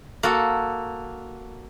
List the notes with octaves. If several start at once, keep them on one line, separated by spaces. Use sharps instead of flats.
A#3 F#4 A4